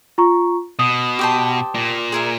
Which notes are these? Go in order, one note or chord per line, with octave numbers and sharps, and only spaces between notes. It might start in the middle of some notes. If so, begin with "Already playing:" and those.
F4 A#5 C#6
B2 D#6
G4 C5 A5
A#2
G#4 A#4 E5